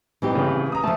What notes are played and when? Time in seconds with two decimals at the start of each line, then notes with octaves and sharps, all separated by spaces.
0.22 E3 G3 C4 D#4 G4
0.35 A1 C#3
0.72 A#5 D#6
0.83 F3 A3 A5